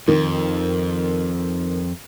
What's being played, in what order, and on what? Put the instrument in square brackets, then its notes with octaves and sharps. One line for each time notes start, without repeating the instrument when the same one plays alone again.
[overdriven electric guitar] F2 [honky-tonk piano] D#3